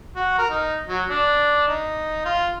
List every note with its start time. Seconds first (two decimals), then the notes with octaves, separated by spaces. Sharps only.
0.16 F#4
0.38 A#4
0.50 D#4
0.88 F#3
1.09 D4
1.68 D#4
2.25 F4